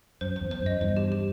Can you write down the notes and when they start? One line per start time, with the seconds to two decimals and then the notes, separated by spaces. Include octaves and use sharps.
0.21 F#2 C5
0.36 E2 C5
0.51 C5
0.61 F#2
0.66 D#5
0.81 E2 G2 C5
0.96 G4
1.12 G4